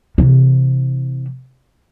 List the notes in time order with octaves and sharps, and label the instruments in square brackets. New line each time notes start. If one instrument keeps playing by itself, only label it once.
[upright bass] C3 E3